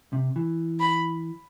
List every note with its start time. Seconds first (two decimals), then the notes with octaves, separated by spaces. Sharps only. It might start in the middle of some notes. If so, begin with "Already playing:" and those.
0.13 C3
0.36 E3
0.80 B5